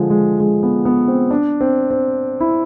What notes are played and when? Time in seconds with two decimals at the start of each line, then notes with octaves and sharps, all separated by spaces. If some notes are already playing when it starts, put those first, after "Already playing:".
Already playing: D3 F3 G#3
0.10 G#3
0.40 G#3
0.63 B3
0.85 B3
1.08 C4
1.31 D4
1.61 C4
1.91 C4
2.40 E4